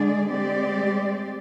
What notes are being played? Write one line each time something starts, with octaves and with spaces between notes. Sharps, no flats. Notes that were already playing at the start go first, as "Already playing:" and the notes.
Already playing: D3 G#3 D4 G#4 D5
G#3 C4 G4 D5